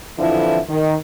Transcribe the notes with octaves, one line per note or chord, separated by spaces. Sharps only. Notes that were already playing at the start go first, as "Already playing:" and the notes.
F2 D3 E3 F3 E4
D#3